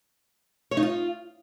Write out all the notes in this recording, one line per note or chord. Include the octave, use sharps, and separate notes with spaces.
C#5
D#4
F4